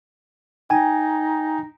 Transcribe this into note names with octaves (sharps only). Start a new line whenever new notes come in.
D#4 G5 G#5